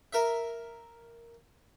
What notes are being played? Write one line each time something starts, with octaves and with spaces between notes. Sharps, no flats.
A#4 E5